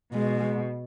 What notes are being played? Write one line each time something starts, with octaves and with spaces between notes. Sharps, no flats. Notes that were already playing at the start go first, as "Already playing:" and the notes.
B2 G#3